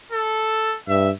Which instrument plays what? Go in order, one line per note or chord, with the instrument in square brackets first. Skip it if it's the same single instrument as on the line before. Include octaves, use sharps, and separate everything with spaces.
[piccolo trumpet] A4
[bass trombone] G2 [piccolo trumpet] E5